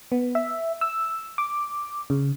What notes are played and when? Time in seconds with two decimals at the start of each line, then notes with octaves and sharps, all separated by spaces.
0.12 B3
0.35 E5
0.81 E6
1.38 D6
2.10 C#3